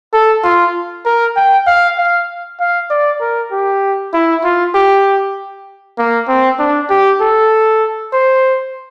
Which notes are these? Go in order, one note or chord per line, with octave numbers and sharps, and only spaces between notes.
A4
F4
A#4
G5
F5
F5
F5
D5
A#4
G4
E4
F4
G4
A#3
C4
D4
G4
A4
C5